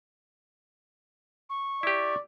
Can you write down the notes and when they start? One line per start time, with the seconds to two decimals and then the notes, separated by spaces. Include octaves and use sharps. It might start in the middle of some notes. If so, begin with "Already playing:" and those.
1.49 C#6
1.83 E4 G4 D5